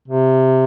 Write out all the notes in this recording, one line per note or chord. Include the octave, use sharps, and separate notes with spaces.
C3